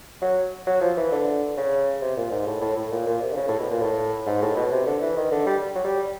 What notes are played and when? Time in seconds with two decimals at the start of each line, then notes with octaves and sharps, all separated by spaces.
0.22 F#3
0.66 F#3
0.81 F3
0.97 E3
1.12 D3
1.57 C#3
2.01 C3
2.17 A#2
2.31 G#2
2.46 A2
2.61 A2
2.77 A2
2.91 A#2
3.06 A#2
3.22 C3
3.32 D3
3.37 C#3
3.48 A2
3.59 B2
3.71 A#2
3.81 A2
4.26 G#2
4.42 A2
4.56 B2
4.71 C3
4.86 D3
5.02 E3
5.17 D#3
5.31 D3
5.46 G3
5.75 F#3
5.84 G3